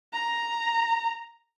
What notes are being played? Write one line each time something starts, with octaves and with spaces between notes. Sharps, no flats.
A#5